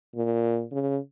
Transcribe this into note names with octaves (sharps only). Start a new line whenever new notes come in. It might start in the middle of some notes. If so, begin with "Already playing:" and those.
A#2
C#3